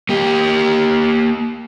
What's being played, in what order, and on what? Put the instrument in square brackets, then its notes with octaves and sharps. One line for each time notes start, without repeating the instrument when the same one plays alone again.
[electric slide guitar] A#3 G4